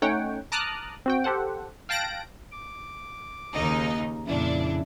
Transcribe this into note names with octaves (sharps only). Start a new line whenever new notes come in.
A3 C#4 D#4 C#5 F#5 G5
A5 A#5 D6 D#6 F6 F#6
C4 F#4 G5
G4 A4 C5 F#5
F5 G5 A5 F#6 A#6 D7
D6
D#2 C#3 D#4
F2 A#2 C#3 D4 E4